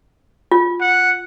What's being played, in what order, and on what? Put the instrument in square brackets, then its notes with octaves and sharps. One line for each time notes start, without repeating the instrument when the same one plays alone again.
[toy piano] F4
[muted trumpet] F#5